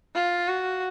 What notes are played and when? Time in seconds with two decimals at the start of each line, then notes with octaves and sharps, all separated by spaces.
0.15 F4
0.48 F#4